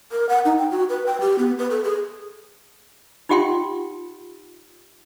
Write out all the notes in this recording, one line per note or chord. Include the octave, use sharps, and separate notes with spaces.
A#4
F#5
D#4
G5
F#4
B4
G5
G4
B3
B4
A4
G#4
D#4 F4 G4 F#5 G5 C6